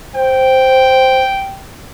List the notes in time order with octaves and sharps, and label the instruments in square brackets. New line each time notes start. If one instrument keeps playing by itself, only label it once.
[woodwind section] C5 [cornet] G5